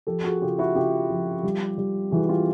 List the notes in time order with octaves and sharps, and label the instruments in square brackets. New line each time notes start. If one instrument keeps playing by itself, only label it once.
[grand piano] F3 [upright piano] G4 A4
[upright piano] F#4 G#4
[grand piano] C#3 [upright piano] F4 G4
[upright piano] E4 F#4
[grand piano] C#3 [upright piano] F4 G4
[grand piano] F3
G3
G3
[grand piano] E3 [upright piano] F#4 G#4
[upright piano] F4 G4